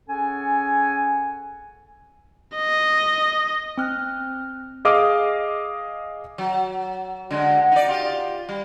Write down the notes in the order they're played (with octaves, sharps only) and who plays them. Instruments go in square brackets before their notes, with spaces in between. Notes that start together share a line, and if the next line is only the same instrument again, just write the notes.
[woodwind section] C#4 G#4 A4 F#5 G#5
[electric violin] D#5
[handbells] C4 F6 F#6
[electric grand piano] G#4 D#5 F5 D6 D#6 F6
[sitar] F#3
D3 G#3
D#4 D5
F4 G4
G3